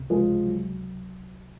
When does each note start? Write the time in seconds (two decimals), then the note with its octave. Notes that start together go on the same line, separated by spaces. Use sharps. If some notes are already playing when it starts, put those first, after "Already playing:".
Already playing: C#2 C3
0.10 C#2 F3 G#3
0.46 F#3